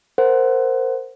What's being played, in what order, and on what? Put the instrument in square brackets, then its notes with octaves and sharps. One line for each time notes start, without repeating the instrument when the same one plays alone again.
[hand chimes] A#4 C5 F#5